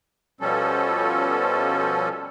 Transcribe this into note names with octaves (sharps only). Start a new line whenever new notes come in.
B2 F3 G3 C#4 A4